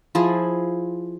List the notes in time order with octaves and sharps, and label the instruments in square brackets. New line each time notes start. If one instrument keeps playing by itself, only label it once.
[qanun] F3 E4 G#4